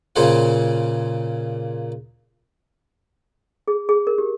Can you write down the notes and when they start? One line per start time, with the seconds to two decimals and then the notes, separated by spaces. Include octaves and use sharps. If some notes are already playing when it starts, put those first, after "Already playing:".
0.16 A#2 C#3 A#3 G#4 C5 F#5
3.68 G#4
3.89 G#4
4.07 A#4
4.18 G4